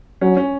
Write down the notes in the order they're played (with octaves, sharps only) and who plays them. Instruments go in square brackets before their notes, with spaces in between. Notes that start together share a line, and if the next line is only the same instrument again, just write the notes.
[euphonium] F#3 [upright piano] C#4
[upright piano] C#4